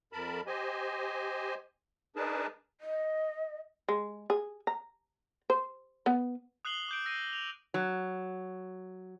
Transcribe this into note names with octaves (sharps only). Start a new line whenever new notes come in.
F2 A#4 A5 B5
G4 C5 D#5 G#5
D4 D#4 G#4 A#4 B4 A5
D#5
G#3
G#4
A#5
C5
B3
D#6 F#6 C7 F#7 G7
D6 G6 D7
E6 A#6 C7 D#7
F7
F#3